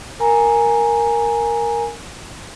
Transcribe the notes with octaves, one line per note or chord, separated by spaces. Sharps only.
A#4 G#5 A#5